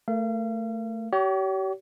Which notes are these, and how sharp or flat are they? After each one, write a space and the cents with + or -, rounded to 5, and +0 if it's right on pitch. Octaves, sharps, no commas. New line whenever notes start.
A3 +15 A#4 +10 F5 -35
G4 -40 C#5 +35